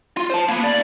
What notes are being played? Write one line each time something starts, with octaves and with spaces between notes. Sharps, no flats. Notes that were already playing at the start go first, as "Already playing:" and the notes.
F4
C5 A5
A#3 B3
D#2 D5